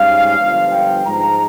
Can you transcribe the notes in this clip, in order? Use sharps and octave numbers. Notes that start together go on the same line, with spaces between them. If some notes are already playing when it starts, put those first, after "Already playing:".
Already playing: G#2 G3 C#4 F5
G1 G2 F3
G5
G#2 F3 G#3 A#5